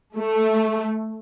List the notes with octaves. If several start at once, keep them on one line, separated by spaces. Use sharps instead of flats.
A3